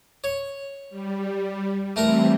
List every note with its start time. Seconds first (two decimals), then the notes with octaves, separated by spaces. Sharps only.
0.24 C#5
0.90 G3
1.96 E3 G3 A3 C4 A#4